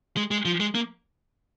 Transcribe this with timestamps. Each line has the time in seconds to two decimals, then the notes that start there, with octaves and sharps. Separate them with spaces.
0.17 G#3
0.31 G#3
0.45 F3
0.60 G#3
0.75 A#3